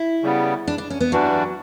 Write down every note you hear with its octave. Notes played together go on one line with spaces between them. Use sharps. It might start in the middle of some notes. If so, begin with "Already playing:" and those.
Already playing: E4
C#3 G3 B3
D4
D4
C#4
B3
G2 E3 F#3 G3 D4 F#4